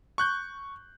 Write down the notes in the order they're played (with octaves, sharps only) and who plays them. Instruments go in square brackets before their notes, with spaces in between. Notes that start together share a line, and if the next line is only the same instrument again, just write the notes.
[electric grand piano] C#6 F#6 G6